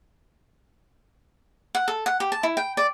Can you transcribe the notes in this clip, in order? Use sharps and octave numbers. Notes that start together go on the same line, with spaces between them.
F#5
A4
F#5
G4
A5
E4
G5
D5